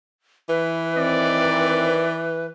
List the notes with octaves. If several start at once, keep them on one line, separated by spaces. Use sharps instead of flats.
E3 B4
D#3 C4 D5